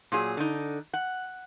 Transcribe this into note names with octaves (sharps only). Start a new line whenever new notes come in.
A#2 F#3 G#4
D3 D#4
F#5